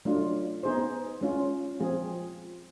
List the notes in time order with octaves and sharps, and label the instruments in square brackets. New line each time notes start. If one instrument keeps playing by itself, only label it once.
[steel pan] F#3 A3 D4 F4
B3 D#4 G#4 C5
G#3 C#4 F4
F3 G#3 C4 F4 G#4